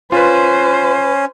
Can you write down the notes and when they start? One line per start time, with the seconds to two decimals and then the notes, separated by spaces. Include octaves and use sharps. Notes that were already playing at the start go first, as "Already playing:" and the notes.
0.12 C#4 F4 B4 C5